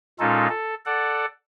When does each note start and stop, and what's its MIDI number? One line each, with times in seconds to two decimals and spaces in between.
0.20 0.47 46
0.20 0.47 56
0.20 0.47 61
0.20 0.47 63
0.20 0.47 65
0.20 0.47 69
0.49 0.75 69
0.86 1.26 69
0.86 1.26 74
0.86 1.26 78